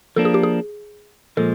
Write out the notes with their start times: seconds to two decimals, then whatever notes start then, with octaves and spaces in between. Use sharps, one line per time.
0.16 F3 A#3 D4 A4
0.25 G#4
0.34 G4
0.43 G#4
1.37 A#2 F3 G#3 A4